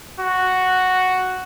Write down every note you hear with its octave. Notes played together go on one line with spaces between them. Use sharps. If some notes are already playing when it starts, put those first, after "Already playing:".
F#4